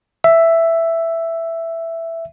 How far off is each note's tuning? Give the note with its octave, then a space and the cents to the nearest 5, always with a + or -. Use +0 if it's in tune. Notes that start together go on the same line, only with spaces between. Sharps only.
E5 +5